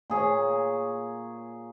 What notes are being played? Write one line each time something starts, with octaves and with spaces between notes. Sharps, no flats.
A#2 G#4 C#5